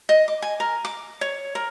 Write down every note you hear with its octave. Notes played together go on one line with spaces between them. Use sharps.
D#5
D6
G#5
A#4
D6
C#5
A#4